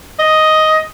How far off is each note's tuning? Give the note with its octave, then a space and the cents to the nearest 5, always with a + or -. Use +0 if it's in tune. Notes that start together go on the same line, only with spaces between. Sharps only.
D#5 +5